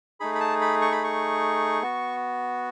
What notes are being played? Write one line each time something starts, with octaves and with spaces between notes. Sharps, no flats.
A3 D#4 G#4 B5
B5
A5
B5
C#6
B5
C#6
B3 F#4